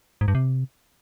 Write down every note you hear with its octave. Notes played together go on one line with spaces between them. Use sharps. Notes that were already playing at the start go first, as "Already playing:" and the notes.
G#2
G2
C3